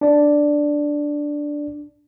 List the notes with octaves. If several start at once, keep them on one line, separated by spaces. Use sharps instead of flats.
D4 D5